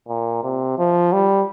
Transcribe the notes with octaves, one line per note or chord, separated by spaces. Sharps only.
A#2
C3
F3
G3